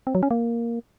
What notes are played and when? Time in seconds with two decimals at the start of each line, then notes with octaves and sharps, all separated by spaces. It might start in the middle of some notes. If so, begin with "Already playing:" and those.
0.07 C4
0.15 F#3
0.23 C#4
0.31 A#3